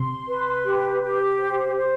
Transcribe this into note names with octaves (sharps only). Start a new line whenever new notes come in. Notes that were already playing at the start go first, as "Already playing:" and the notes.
Already playing: C3 C6
B4
G4
G4
C5
C5